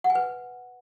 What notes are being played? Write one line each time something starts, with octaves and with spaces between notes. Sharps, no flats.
F#5
G#5
B4